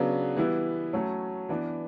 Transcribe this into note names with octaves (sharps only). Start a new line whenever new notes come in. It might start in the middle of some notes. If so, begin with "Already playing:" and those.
Already playing: C#3 F#3 B3 D4
E3 G3 B3 E4
F#3 A3 C#4
E3 B3 D4